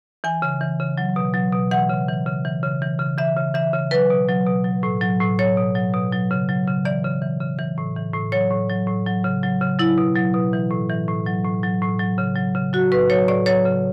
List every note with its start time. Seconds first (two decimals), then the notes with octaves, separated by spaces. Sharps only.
0.24 E3 G#5
0.42 C#3
0.61 E3
0.80 C#3
0.98 F#3
1.16 B2
1.34 F#3
1.53 B2
1.71 E3 F#5
1.89 C#3
2.09 E3
2.26 C#3
2.45 E3
2.63 C#3
2.82 E3
2.99 C#3
3.18 E3 E5
3.37 C#3
3.54 E3 E5
3.73 C#3
3.91 F#3 B4
4.10 B2
4.29 F#3
4.47 B2
4.64 F#3
4.83 A2
5.01 F#3
5.20 A2
5.39 F#3 C#5
5.57 B2
5.75 F#3
5.94 B2
6.12 F#3
6.31 C#3
6.49 F#3
6.67 C#3
6.85 E3 D5
7.04 C#3
7.22 E3
7.40 C#3
7.59 E3
7.78 A2
7.96 E3
8.14 A2
8.32 F#3 C#5
8.50 A2
8.69 F#3
8.87 A2
9.06 F#3
9.24 C#3
9.43 F#3
9.61 C#3
9.79 F#3 E4
9.98 B2
10.16 F#3
10.34 B2
10.53 E3
10.71 A2
10.90 E3
11.08 A2
11.26 F#3
11.45 A2
11.63 F#3
11.82 A2
11.99 F#3
12.18 C#3
12.36 F#3
12.55 C#3
12.73 F#3 F#4
12.92 A2 B4
13.10 F#3 C#5
13.28 A2 D5
13.46 F#3 C#5
13.65 C#3